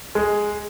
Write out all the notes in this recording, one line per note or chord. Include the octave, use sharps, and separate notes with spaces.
G#3